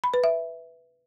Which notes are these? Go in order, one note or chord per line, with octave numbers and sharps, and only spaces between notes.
B5
B4
E5